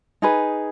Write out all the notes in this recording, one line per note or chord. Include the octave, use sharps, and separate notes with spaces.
D#4 G#4 B4